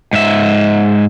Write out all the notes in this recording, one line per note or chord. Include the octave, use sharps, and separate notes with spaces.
G#2 E5